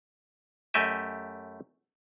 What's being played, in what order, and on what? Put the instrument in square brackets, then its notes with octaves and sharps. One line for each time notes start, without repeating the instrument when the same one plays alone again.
[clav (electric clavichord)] F#2 A3 G4 D#5 E5 G#5